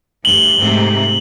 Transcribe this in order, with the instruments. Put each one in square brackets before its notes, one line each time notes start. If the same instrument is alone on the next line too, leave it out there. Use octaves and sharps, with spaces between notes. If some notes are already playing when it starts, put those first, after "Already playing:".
[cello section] D2 G2 [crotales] F#7 G7
[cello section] G#2 C3 A3